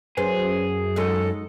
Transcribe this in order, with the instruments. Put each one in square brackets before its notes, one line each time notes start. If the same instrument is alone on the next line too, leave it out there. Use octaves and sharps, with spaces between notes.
[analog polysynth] F#2 [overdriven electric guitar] G#4 [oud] B4 C5
[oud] F#3 G#3 D#4 [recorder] A4